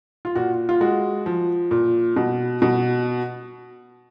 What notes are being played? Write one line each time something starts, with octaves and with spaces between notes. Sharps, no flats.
F4
A#2 F#4
F4
G#3 F#4
F3
A#2
B2
B2